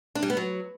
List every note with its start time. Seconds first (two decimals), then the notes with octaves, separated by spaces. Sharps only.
0.15 D4
0.23 G3
0.30 B3
0.37 F#3